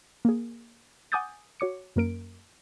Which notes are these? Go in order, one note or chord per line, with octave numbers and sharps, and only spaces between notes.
A#3 G#4
F#5 G#5 D6 D#6 G6 A6
F#4 C#5 D6 C#7
F#2 A#3 A#4 D7